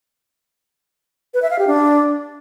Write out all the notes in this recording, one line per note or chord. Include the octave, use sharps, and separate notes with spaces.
B4
E5
F5
G4
D4